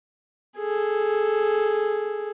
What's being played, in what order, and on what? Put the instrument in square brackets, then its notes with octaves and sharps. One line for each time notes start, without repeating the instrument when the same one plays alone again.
[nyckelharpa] G#4 A4